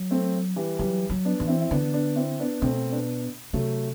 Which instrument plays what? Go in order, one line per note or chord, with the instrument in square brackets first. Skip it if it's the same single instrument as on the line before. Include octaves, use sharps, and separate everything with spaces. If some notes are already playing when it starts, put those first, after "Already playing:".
Already playing: [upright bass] F#3
[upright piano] A3 C4
E3 G3
[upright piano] E3 G3 [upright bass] F#3
[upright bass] F#3
[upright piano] B3 D4
[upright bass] E3
[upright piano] C4 E4
E4
[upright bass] D3 [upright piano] B3 D4
[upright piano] B3 D4
C4 E4
B3 D4
[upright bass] B2 [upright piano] A3 C4
[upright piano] B3 D4
[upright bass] C3 [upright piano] F#3 A3